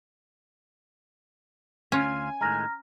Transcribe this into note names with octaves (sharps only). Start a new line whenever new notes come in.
D2 C#4 F4 G#5
A2 D#3 G#3 A#5 F6 A#6